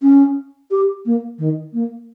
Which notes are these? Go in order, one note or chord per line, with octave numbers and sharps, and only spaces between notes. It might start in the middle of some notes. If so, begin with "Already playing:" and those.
C#4
G4
A#3
D#3
A#3